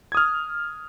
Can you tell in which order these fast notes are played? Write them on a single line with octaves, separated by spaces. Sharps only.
G#6 D#6 F6